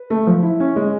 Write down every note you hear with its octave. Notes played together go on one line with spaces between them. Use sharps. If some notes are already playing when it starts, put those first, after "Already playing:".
Already playing: B4
A3
F3
E4
C#4
G#3